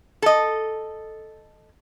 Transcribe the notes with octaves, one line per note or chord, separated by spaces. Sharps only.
A4 D#5